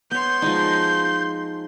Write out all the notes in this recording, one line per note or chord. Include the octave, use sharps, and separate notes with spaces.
B3 C#5 C6 G6
F3 G#3 D#4